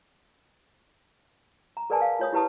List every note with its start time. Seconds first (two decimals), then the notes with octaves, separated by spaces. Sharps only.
1.77 A#5
1.90 G#4 A#4 B4 D5 G#5 A5
2.01 F5
2.19 F4 C#5 D#6
2.32 E4 G4 B4 A5 D#6